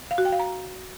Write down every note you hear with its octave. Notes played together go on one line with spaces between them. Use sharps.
F5
F#4
G5
F5
A#5